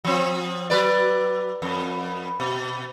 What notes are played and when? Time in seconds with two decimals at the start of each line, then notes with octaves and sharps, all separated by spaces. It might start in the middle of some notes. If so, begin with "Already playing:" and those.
0.05 F3 C4
0.70 F#3 B4 D5
1.62 F2
2.40 B2